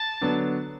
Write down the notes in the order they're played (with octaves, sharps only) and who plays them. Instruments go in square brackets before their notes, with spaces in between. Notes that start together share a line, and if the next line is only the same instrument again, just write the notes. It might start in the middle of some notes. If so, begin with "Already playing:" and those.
Already playing: [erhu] A5
[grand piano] D3 F#3 B3 D4